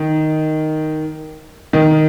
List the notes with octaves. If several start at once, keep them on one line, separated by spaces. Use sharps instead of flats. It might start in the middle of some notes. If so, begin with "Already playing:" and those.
Already playing: D#3
D#3